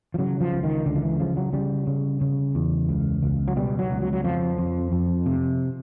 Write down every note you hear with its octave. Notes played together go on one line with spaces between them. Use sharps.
F3
C#3 F#3
F3
C#2
D#3
C#2 D3
F3
E3
C#3 F3
F#3
C#3 G3
C#3
C#3
E2
C#2
C#2
F#3
B2 G3
F#3
C#2
F#3
F#3
F2 F3
F2
F2
C3